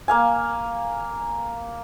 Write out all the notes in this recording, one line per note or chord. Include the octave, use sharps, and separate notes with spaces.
A#3 F5 G#5